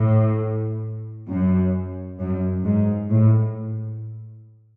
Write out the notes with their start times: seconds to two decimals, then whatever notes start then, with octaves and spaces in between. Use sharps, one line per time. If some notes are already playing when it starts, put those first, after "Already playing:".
Already playing: A2
1.29 F#2
2.20 F#2
2.65 G#2
3.11 A2